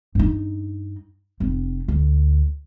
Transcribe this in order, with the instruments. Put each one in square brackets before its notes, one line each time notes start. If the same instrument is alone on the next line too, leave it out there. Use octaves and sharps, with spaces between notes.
[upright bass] G2 D#4
F1 C4
D2